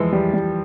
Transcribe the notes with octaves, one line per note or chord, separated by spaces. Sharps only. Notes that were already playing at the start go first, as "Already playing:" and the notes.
Already playing: E3 F3 G#3 E4
G3
G3